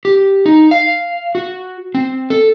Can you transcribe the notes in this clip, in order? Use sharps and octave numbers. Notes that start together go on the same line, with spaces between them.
G4
D#4
F5
F#4
C4
A4